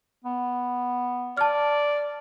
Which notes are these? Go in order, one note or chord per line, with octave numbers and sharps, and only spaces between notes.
B3
D5 A5 F6